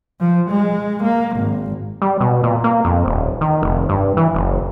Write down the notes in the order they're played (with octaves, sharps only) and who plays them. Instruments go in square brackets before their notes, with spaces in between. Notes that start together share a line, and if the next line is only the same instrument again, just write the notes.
[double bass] F3
G#3
A#3
G#1
[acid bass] G3
B2
A#2
A#3
F2
D#1
D#3
F1
G2
E3
F#1